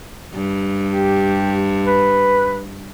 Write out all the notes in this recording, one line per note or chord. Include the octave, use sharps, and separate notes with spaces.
G2
G4
B4